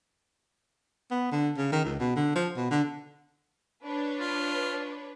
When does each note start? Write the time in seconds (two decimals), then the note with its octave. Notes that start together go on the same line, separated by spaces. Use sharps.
1.11 B3
1.32 D3
1.57 C#3
1.72 D#3
1.85 C#2
2.00 B2
2.16 D3
2.36 F3
2.57 B2
2.71 D3
3.84 D4 B4 C#5
4.20 F4